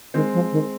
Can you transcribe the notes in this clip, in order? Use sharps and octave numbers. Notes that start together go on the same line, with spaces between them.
D#3 G#3 C4
F3
D#3